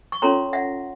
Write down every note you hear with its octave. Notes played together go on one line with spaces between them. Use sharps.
C#6
C#4 F4 A4 C#5 A#5 C6
E5 F#5